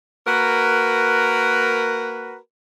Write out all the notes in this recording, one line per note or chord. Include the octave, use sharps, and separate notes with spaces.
A#3 F#4 A#4 B4